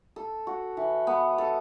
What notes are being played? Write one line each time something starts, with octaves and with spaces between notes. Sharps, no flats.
A4
F#4
E3
B3
A4